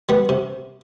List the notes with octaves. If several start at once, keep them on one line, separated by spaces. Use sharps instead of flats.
G3 B3
C3